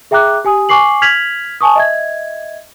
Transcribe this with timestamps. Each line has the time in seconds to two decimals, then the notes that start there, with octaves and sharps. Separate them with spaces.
0.11 G#4 E5 G5 A#5 D6 F#6
0.45 G4 G#5 D#6
0.69 G#5 C#6 D6 C7 F#7
1.02 F6 G#6 B6 F7 F#7
1.61 G#5 A5 C#6 D#6
1.76 D#5 E5 G#6